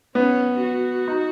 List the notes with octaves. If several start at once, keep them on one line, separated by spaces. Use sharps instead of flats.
B3 C#4
F#4
D#4